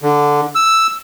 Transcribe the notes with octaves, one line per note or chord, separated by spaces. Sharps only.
D3
E6